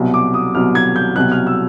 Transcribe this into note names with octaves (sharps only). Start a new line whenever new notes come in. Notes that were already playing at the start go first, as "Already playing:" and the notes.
Already playing: C2 B2 F#3
D6
D#6
C2 B2 F#3 F6
G#6
G6
C2 B2 F#3 F#6
F6
E6